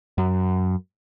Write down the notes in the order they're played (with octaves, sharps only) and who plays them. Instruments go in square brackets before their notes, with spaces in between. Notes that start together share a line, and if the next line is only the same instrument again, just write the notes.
[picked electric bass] F#2